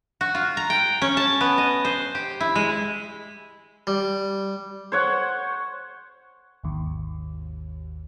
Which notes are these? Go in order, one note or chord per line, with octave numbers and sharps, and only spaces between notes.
F#4
F4
A#5
G5
C#4
A5
B3
D#5
C5
G4
E4
G#3
G3
C5 C#5 F#5
G#1 D#2